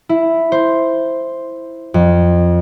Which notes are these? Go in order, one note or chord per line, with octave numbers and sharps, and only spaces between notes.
E4
C5
F2